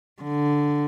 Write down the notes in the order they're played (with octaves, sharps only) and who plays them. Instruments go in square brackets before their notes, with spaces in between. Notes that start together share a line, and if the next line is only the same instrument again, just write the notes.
[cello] D3